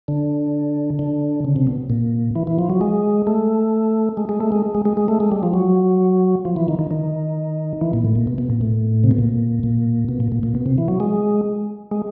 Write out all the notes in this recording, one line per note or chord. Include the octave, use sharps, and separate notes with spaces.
D3
D3
C#3
C3
B2
A#2
E3
E3
F3
F#3
G#3
A3
G#3
G#3
A3
G#3
G#3
G#3
G#3
A3
G#3
G3
F3
F#3
F3
E3
D#3
D#3
D#3
E3
A#2
A2
A#2
B2
B2
A#2
A2
C3
B2
A#2
A#2
B2
A#2
A#2
A#2
B2
C3
E3
F#3
G#3
G#3